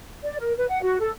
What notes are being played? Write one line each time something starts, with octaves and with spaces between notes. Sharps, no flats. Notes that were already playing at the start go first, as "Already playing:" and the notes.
D5
A#4
B4
F#5
F#4
A4